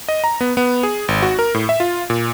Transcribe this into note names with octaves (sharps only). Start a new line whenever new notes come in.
D#5
A#5
B3
B3
G#4
G#1
F#4
A#4
A2
E5
F4
A#2